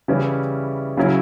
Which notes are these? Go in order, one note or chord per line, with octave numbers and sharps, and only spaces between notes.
C#3 E3 G3 C#4 E4
C#3 F#3 C#4 E4